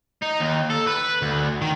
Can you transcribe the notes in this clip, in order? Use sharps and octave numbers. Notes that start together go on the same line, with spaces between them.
D#4
D#2
A4
B4
D2
D#3